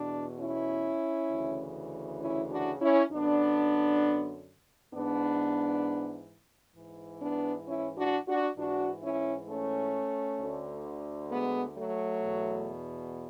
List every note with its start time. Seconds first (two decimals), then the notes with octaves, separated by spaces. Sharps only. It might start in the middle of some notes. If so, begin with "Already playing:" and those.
Already playing: E2 B2 D4
0.39 C#4 E4
1.30 D2 C#3 E3
2.21 C#4 E4
2.50 D4 F#4
2.81 C#4 E4
3.11 F#2 D3 B3 D4
4.93 G#2 E3 B3 D4
6.76 G#2 E3
7.21 B3 D4
7.67 C#4 E4
7.98 D4 F#4
8.28 D4 F#4
8.57 G#2 E3 D4 F#4
9.03 C#4 E4
9.49 A3 C#4
10.39 D2 D3
11.31 G#3 B3
11.76 F#3 A3
12.23 E2 B2